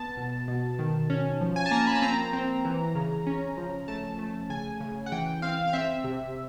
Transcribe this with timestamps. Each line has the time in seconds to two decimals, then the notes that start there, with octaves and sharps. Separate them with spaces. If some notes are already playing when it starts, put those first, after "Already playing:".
Already playing: B3 A5
0.17 B2
0.48 B2
0.79 D#3
1.10 C#4
1.41 F3
1.56 G#5
1.66 A5
1.71 A#3 A#5
1.87 B5
1.95 A5
2.02 C4 A#5
2.33 C4
2.65 E3
2.95 C#3
3.27 C#4
3.57 F3
3.88 A3 A5
4.19 A3
4.50 C#3 G#5
4.80 C#3
5.06 F#5
5.12 E3 G5
5.42 C4 F5
5.68 F5
5.73 C4 E5
6.04 C3